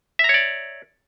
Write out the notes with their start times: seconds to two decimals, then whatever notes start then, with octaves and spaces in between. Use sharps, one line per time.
0.19 E5
0.24 A#5
0.29 C#5
0.34 D5